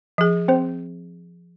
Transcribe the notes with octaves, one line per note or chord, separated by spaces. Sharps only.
F3 G#4
C4 C5